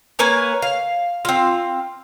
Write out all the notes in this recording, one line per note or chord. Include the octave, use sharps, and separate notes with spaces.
A#3 B4 C#5 G#5
F5
C4 F4